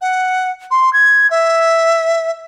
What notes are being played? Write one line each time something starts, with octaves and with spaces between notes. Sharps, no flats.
F#5
C6
G#6
E5